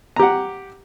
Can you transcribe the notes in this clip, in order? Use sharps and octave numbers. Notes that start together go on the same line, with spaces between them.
G4 F#5 A#5